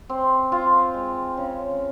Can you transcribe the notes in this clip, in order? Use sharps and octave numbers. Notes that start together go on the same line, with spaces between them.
C4
F4
G#3
C#3